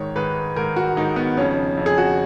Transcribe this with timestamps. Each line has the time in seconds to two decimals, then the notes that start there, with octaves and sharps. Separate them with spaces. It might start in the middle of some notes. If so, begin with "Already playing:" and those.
Already playing: G#2 D#3 C#5
0.16 G#2 D#3 B4
0.56 G#2 D#3 A#4
0.76 F#4
0.96 G#2 D#4
1.00 D#3
1.16 B3
1.37 F2 C#4
1.42 C#3
1.77 F2 C#3
1.86 G#4
1.98 F#4